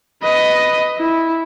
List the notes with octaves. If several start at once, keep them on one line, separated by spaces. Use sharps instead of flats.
B4 D#5
E4